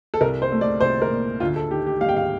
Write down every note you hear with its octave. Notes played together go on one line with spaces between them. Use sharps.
A4
C2 A#4
C5
A3
D5
C2 C5
A#4
A#2
D2 F4
A4
D#3 G4
G4
G3 F5
G5
F5